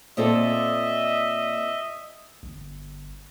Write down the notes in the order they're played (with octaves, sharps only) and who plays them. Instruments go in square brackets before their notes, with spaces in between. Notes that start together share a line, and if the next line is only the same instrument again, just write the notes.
[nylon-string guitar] A#2 C4 A4 [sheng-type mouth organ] D#5 E5
[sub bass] G1